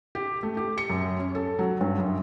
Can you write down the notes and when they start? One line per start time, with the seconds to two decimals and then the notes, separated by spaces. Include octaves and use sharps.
0.15 G4
0.43 A3
0.57 G4
0.78 C#7
0.90 F#2
1.19 C#4
1.35 A4
1.59 F#3
1.81 G2
1.98 F#2